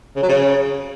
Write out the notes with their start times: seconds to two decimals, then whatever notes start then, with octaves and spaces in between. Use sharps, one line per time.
0.16 C#3
0.22 F#3
0.28 C#3